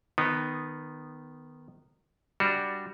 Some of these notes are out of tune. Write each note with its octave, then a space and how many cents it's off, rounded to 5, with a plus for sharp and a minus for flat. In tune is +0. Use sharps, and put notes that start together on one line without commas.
D#3 -15 B3 +5 D#4 -15
G3 +0 D4 +0 F#4 +0